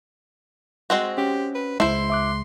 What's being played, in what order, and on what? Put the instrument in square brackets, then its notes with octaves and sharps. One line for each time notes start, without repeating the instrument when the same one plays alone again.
[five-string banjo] G#3 C4 F#4
[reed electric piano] C#4 [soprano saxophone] G4
[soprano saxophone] B4
[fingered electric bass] C#2 G#3 [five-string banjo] E4 C5 [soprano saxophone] C6
[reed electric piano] E5 D6 F#6